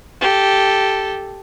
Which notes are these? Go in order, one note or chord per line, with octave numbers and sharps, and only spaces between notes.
G4 A4